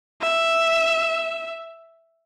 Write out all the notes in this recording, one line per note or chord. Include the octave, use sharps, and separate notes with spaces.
E5